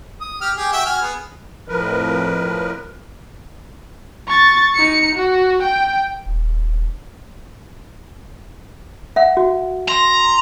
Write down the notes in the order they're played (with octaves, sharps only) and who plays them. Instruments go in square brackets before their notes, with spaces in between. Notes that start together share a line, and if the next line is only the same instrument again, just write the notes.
[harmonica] D#6
G4 F6
G4 G#4
F#4 E5 G5
F#4 G#5 F6
B3 G#4
[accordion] F2 A2 F3 A#4 B4
[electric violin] C#6 A6
D#4 C#7
F#4
G5
[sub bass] D#1
[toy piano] E5 F#5
F#4
[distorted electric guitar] A#5 [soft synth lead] C6